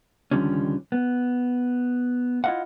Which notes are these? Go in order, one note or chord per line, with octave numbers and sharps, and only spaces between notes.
C#2 D3 D#3 F3 G3 C#4
B3
E4 F4 A#4 D#5 F5 F#5